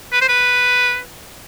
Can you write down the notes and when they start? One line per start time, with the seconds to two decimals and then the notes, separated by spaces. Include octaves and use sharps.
0.13 B4
0.21 C5
0.29 B4